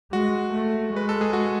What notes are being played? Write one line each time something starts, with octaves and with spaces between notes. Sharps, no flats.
G#3 F#4
A3
G#3 B4
A4
G#4
F#4